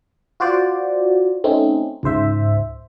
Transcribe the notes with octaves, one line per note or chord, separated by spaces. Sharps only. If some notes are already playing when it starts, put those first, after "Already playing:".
F4 F#4 C5 D5
A3 C4 C#4 D#4
C#2 G#2 C5 E5